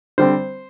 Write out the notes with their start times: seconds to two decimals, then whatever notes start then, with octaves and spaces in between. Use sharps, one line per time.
0.18 D3 G3 C4 C5